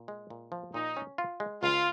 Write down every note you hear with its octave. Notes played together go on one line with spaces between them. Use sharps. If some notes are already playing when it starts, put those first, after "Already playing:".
Already playing: A#2
G#3
A#2
F3
A#2 D#4
C#4
F4
G#3
C#2 F4